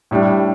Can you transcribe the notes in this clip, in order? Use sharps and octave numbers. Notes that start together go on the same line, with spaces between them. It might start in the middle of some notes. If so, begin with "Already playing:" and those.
A2 G3 D4